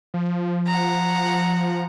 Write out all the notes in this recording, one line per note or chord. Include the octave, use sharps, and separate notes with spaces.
F3
F#5 A#5